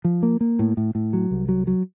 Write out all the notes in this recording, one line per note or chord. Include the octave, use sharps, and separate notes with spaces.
F3
A#3
A#3
A2
A2
A2
F#3
C2
F#3
F#3